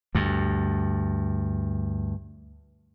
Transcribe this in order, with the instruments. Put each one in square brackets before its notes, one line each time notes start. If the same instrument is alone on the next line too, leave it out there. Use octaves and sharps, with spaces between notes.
[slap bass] D2 G2